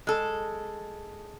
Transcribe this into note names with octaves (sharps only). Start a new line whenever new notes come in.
G#3 A4